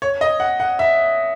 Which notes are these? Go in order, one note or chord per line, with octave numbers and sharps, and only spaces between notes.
C#5
D#5
F#5
F#5
E5